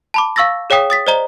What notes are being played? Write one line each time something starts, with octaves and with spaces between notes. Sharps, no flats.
A5 B5 D6
F5 C#6 E6 A6 A#6
G#4 C#5 F5 G5 D#6 B6
D#6 A6 B6
C5 D5 D#5 A#5 G7